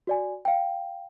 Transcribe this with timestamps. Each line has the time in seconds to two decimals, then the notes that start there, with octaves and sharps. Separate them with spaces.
0.07 F#4 D5 G#5
0.45 F5 G5